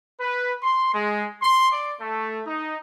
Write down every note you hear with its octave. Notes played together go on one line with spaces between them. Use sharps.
B4
C6
G#3
C6
D5
A3
D#4